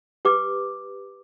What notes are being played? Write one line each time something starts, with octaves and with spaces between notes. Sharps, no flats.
G4 B4 D6